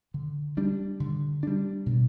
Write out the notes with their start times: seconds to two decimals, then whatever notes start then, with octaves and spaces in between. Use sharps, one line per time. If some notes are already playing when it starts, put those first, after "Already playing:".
0.14 D3
0.57 G3 D4
1.00 D3
1.43 G3 D4
1.86 B2